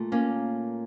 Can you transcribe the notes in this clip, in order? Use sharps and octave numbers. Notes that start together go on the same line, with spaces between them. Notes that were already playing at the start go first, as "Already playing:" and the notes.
Already playing: A#2 A3
A#3 C#4